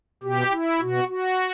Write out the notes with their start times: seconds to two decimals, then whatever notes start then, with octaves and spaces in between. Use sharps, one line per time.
0.23 B2 G4
0.51 E4
0.80 B2 F#4
1.08 F#4